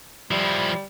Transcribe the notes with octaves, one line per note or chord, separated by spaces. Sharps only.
F3 G3 E4